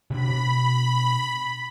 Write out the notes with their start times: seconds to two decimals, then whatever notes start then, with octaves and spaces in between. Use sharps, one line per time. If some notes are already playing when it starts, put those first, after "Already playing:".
0.10 B2 C4 D4 B5